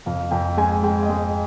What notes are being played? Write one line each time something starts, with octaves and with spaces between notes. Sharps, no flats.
F2 F5
F2 G5
G#3 G#5
G#3 G5
D#5
G#3